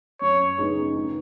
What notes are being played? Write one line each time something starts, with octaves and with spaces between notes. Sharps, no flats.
F#2 C#5
C#3 B3 D#4 G#4
D#3